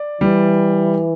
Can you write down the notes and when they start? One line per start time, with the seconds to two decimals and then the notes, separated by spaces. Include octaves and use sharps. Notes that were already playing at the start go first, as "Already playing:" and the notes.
Already playing: D5
0.21 E3 G3